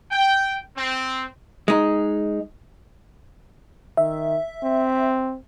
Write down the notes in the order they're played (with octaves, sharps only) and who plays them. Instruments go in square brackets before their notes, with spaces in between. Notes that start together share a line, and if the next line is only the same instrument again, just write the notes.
[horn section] G5
C4
[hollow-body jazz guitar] G#3 D#4
[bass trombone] D#3 [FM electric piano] E5
[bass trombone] C4